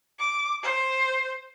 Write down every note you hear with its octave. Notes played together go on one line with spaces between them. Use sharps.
D6
C5